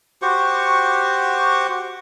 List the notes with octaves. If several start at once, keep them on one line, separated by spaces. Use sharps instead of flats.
F#4 G4 C5 C#6